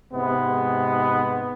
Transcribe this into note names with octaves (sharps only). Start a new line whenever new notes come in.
G#2 C3 G#3 B3